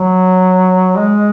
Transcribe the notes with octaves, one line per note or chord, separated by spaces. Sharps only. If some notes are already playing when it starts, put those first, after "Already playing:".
Already playing: F#3
G#3